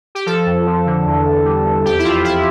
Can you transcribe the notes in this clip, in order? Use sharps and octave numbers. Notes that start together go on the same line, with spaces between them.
G4
F3 A4
F2
F3
D3
E2
E2
G3
E2
F2 G4
E4
F2 F4
F2 E4